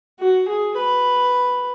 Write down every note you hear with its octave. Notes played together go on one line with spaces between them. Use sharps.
F#4
G#4
B4